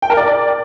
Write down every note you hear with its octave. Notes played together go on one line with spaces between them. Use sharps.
G5
A#4
D5